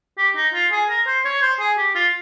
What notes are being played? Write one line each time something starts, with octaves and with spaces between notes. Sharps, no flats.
G4
D#4
F4
G#4
A#4
C5
C#5
C5
G#4
G4
F4